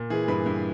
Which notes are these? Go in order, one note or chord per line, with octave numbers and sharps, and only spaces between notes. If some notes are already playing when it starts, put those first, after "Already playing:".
Already playing: A#2
E3 G#4
G2 B4
G2